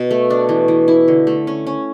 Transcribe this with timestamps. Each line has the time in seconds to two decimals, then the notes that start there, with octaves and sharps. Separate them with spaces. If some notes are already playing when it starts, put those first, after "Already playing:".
Already playing: B2
0.11 A3
0.30 D4
0.49 E3
0.68 E3
0.88 E4
1.08 D3
1.27 A3
1.47 C#4
1.67 C#4